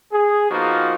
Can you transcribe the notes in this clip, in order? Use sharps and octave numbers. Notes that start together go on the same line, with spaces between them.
G#4
F3 A#3 B3 D#4 F4 F#4